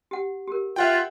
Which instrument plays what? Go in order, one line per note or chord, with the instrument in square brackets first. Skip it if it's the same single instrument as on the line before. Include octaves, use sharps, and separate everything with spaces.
[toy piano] G4 F#5
G4 A#4
[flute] F4 [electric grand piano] E5 F#5 G5